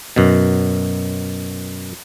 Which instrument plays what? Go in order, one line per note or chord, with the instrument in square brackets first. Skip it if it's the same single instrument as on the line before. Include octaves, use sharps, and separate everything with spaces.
[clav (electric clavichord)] F#2 B2